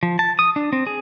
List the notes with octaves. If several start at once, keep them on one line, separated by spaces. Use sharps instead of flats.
F3
A5
D#6
D4
C4
G#4